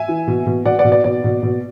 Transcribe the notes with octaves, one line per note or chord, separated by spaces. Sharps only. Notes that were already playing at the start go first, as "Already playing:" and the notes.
Already playing: E5 G#5
E3
B2
B2
B2 D5 F#5
D5 F#5
B2
D5
B2 D5
B2
B2